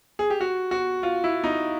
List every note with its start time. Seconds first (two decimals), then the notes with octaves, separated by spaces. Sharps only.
0.19 G#4
0.30 G4
0.41 F#4
0.71 F#4
1.03 F4
1.24 E4
1.44 D#4